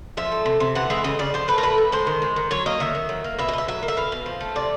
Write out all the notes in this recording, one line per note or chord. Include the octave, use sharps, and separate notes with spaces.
F3 E5
A3
C3
C3
E3 F#5
G#3 E5
C#3 D#5
C#3 D5
F3 C5
A3 B4
A#4
A2 B4
A2
G#3 C5
D#3
G#3
D#3
F#3 C#5
A#3 D#5
D#3 E5
D#3
F#3
A#3
B2 E5
D#5
B2 E5
F#3 E5
A#3
E5
B2 F5
B2
F3
A3
C3 D5